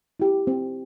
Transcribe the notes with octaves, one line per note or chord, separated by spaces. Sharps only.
E4 G4
C4